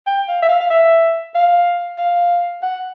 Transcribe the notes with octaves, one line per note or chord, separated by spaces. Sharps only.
G5
F5
E5
F5
F5
E5
F5
F5
F#5